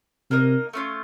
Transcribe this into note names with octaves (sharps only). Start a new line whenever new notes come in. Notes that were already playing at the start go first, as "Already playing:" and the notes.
C3 A#3 D#4 A#4 D#5
A3 C#4 F4